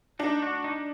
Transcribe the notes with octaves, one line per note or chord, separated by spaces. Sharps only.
D4 D#4
F#4
D#4